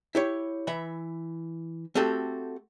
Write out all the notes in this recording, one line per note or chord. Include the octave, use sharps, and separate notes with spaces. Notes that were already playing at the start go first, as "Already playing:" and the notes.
E4 G4 C#5
E3 E5 B5
A3 C4 F#4 G4 A4